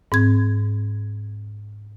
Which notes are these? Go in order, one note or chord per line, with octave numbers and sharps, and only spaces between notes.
G#2 C4 G#6